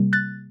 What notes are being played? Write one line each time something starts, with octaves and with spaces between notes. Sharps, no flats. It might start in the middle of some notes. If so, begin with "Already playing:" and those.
Already playing: C3 G3 A#3
F#6 A6